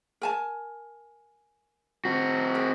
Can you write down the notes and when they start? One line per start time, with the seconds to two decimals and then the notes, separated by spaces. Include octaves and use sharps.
0.22 A#4 G#5 A5
2.05 C4 F#4
2.55 A#4